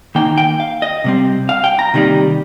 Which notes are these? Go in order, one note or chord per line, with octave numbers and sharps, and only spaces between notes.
D#3 A#3 D#4 G5
G5
F5
D#5
C3 G3 C4
F5
G5
A#5
C3 D#3 G3 A#3 D#4